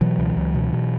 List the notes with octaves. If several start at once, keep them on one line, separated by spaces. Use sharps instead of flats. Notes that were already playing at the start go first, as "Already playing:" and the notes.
B2 E3 F#3
C#2
C#2
B2
B2